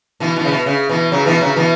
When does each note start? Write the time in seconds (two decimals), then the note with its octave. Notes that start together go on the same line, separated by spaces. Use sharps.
0.20 B2 E3
0.36 B2 E3
0.45 C#3
0.51 B2
0.66 C#3
0.89 B2 E3
1.12 C#3 F#3
1.26 B2 E3
1.41 C#3 F#3
1.56 B2 E3